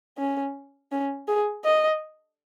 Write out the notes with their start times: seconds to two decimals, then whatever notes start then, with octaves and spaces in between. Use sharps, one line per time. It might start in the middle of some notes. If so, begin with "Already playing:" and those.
0.18 C#4
0.92 C#4
1.28 G#4
1.65 D#5